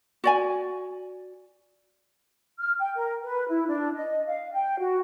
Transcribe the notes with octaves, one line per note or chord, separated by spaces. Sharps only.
F#4 D5 G#5
F6
G5
A#4
B4
E4
D4
D#5
F5
G5
F#4